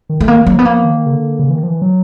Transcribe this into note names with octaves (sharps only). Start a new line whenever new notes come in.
D#3
A3
D#3 A#3
F#3 A#3
F3 B3
A#3
D#3
C#3
D3
C#3
E3
D#3
F3
E3
F#3